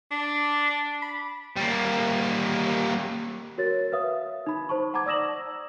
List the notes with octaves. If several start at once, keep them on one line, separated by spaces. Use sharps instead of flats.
D4
B5
G3 A#3
F#4 A#4 C#5 A6
B4 E5 F5 D#6
D#4 B5
C5 A5 C#6
F#5 A5 A#5 D6 G#6
D5 D#6 E6 A#6 E7 F#7